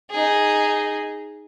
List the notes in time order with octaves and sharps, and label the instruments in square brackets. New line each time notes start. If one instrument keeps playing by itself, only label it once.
[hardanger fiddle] D#4 G#4